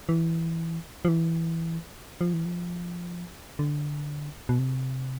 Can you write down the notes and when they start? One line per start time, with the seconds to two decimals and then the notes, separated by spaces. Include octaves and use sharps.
0.09 E3
1.05 F3
1.08 E3
2.21 F3
2.33 E3
2.45 F3
3.59 D3
4.49 B2
4.59 C3